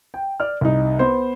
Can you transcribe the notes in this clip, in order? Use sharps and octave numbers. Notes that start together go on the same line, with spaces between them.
G5
D5 F6
C2 D#4
B3 C5